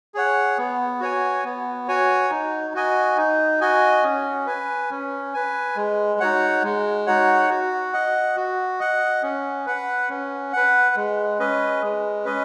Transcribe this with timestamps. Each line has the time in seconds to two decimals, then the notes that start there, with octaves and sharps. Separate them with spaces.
0.14 G#4 C#5 F#5
0.58 B3
1.00 F#4 C#5 G#5
1.44 B3
1.88 F#4 C#5 G#5
2.30 D#4
2.74 F#4 D#5 G#5
3.17 D#4
3.61 F#4 D#5 G#5
4.03 C#4
4.46 B4 G#5
4.91 C#4
5.34 B4 G#5
5.76 G#3
6.20 D#4 F#4 C#5 F#5
6.63 G#3
7.07 D#4 F#4 C#5 F#5
7.50 F#4
7.93 D#5 F#5
8.37 F#4
8.80 D#5 F#5
9.23 C#4
9.66 B4 F#5
10.09 C#4
10.52 B4 F#5
10.96 G#3
11.39 C#4 B4 D#5
11.82 G#3
12.25 C#4 B4 D#5